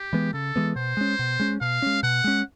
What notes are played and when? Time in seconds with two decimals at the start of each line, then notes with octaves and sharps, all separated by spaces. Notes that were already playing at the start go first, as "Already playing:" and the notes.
Already playing: G4
0.13 E3 G#3 B3
0.34 C#3 A4
0.56 E3 G#3 B3
0.76 B2 C5
0.97 G#3 C#4
1.19 B2
1.40 G#3 C#4
1.61 B2 F5
1.82 G#3 C#4
2.03 B2 F#5
2.24 G#3 C#4